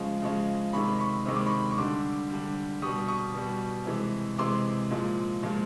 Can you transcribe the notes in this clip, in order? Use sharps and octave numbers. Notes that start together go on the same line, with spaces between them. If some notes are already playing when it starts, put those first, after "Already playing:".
Already playing: C#3 F3 G#3
C#3 F3 G#3
C3 D#3 G#3 B5 C#6
B5 C#6
C3 D#3 G#3 C#6
D6
B5 C#6
C#6
D3 G3 C6 D6
D3 G3
B2 G3 C#6 D#6
C#6 D#6
B2 G3
C3 E3 G#3
C3 E3 G#3 C6 D6
A#2 F3 G#3
A#2 F3 G#3